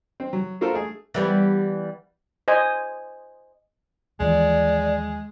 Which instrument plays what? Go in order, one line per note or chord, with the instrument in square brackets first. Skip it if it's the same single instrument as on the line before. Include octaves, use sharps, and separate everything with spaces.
[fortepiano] C4
F#3
A#3 F4 F#4 A4 A#4 C5
A3 G#4
[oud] E3 G3 B3
[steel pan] C5 D#5 G#5
[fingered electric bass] D#2 E3 F3 [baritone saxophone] G#3 [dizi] D5